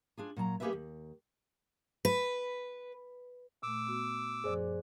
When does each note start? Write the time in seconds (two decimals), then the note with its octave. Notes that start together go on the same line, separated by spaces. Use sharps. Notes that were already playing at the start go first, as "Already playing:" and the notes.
0.18 D4 F4 G#4
0.37 A#2 F#3 A5 A#5
0.60 A#3 C#4 G4 G#4 B4 E5
0.73 D#2
2.05 B4
3.63 A#2 A3 D6 E6
3.87 B3 F#4
4.44 F#2 F3 G#4 C5 D5